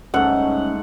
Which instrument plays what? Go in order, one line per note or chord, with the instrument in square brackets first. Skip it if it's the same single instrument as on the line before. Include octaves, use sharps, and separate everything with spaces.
[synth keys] C#2 G3 [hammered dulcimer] G#2 A3 [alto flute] C#4 [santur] F#5